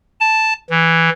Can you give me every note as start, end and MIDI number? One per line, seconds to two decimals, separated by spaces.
0.20 0.53 81
0.70 1.09 52